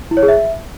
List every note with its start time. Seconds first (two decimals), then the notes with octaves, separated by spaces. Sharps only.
0.11 E4
0.17 C#5
0.23 G#4
0.28 E5